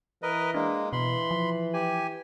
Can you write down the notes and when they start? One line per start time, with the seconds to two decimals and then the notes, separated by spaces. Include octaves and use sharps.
0.23 E3 A#4 B4 D#5
0.54 G#3 A#3 D4
0.93 B2 E3 B5 C6
1.31 F3
1.74 G4 G#5